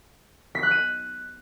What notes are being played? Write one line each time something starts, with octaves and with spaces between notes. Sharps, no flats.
B6
F#6
D#7